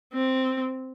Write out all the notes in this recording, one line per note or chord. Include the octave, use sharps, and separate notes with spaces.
C4